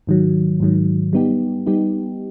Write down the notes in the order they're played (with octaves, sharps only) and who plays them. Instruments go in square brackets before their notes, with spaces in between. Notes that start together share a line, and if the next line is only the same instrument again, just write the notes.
[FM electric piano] G#2 D#3 F#3
G#2 D#3 F#3
G3 B3 D#4 G4
G3 B3 D#4 G4